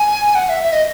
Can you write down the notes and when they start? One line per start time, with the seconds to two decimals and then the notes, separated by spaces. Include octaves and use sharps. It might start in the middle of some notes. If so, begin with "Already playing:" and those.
Already playing: G#5
0.35 F#5
0.49 E5
0.63 E5
0.72 D#5